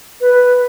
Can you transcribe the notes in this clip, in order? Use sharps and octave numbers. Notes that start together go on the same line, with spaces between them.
B4